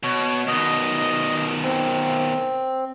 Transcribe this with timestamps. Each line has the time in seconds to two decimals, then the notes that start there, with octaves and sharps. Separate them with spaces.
0.03 B2 C#5
0.48 B2 D#3 D#5
1.63 C4